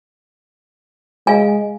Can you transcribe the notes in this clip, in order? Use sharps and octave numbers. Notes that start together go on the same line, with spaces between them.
G#3 F5 G#5